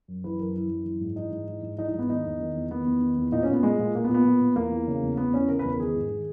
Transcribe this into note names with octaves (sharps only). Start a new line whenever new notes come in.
F#2
E3 B4
F#2 A#4
E3 E4
F#2
E3
G#2
E3 D#4
G#2
E3
G#2
E3 D#4
D#4
G#2 B3
D#3 D#4
E2
D#3
E2
D#3 B3
E2
D#3
E2
A#2 D#4
C#4
A#2 B3
A#2 G#3
A#2
A#2 A#3
B3
A#2
B3
A#2
A#2
E2 A#3
E3
C#3
E2
E2 B3
E3 C#4
C#3 A#4
B4
E2
A#4
D#3 G#4
G#2
D#3